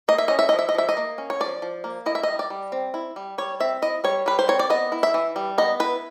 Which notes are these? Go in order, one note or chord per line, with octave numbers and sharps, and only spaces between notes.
A#3 D#5
E5
C#4 D#5
E5
F3 D#5
E5
D#5
F3 E5
D#5
A#3
C#4
C#5
F3 D5
F3
A#3
E4 D#5
E5
G3 D#5
D5
G3
C4
E4
G3
G3 C#5
C4 E5
E4 D#5
G3 C#5
G3 B4
C5
C4 C#5
D5
B3 D#5
E4
E5
E3
G3
B3 D#5
E4 B4